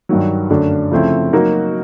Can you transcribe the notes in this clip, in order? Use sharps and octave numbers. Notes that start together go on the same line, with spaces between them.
G2 D#3 F#3
F#2 D3 F#3 A3 D4
C#3 F3 A3 C4 E4
F#3 A#3 D#4 F#4 A#4